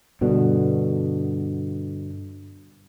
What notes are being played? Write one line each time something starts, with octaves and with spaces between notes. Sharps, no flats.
G2 B2 D3